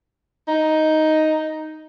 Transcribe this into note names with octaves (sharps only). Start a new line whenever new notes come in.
D#4